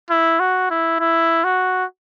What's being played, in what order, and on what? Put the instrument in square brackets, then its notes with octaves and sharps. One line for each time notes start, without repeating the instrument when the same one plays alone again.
[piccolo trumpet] E4
F#4
E4
E4
F#4